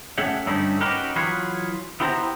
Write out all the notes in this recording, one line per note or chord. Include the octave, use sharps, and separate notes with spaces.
A3 C#4 G#4 E5 F#5 G5
G2 D3 A3 C#4 D#4 E4
C#4 D#4 F#4 G4 A#4 B4
E3 F#3 F4 G#4 B4 C#5
B3 E4 G4 C5 A5 A#5